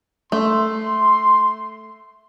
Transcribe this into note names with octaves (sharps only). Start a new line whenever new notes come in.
A3 C6